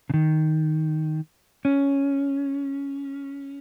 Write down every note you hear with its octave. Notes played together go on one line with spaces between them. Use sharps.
C#3
D#3
C#4